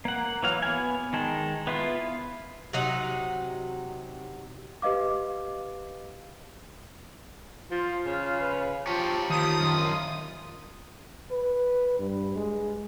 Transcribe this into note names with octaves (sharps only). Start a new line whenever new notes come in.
A#3 F#5
E3 F#3 F5
B3 G#5
D#3 G#3 A5
B3 E4 F4
C3 F#3 D#4 F#5
G4 B4 D#5 F5 D6
F3 F4
C#3
B4
F3 G4 C#5 A5
D#3 F3 D#6
F#2 F4
B4
G2
G#3